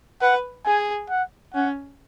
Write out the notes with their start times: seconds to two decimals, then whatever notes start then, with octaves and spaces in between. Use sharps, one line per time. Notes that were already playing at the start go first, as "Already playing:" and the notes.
0.22 B4 F#5
0.65 G#4 G#5
1.10 F#5
1.54 C#4 F#5